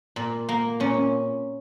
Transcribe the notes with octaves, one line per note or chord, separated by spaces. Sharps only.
A#2
A#3
A#2 C#4